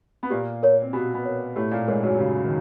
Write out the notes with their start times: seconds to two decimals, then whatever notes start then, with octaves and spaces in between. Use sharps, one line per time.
0.23 B3
0.30 A#2 A#3 G4
0.63 A#4 C#5
0.82 C4
0.93 B2 B3 G4
1.14 B2 B3
1.25 A#4 C#5
1.56 A2 A3 G4
1.71 A#2 A#3
1.88 G#2 G#3 A#4 C#5
2.03 F#2 F#3
2.19 C#3 G4
2.44 D#3